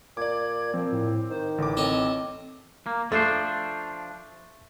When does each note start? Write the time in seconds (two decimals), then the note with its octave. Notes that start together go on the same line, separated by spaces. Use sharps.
0.17 A#2 D5 D6 G#6
0.74 A#2 F3 C4
0.92 A2
1.30 D#3 C5
1.58 A1 D3 D6
1.77 C4 A4 C#5 D#5
2.86 A#3
3.12 F3 A3 D4 C5